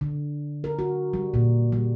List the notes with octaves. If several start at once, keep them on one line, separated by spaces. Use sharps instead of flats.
D3
A#4
F#4
G3
A#2
G3